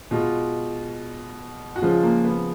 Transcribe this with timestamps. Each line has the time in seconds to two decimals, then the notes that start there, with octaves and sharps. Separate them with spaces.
0.11 B2 G#3 F4
1.76 F#4
1.82 C#3 F3 G#3 F4
2.03 A#3
2.25 B3